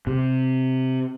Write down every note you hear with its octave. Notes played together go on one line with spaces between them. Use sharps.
C3